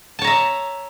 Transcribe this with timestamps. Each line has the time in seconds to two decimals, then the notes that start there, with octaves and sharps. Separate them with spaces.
0.19 A5
0.22 C#5
0.24 A#5
0.27 E5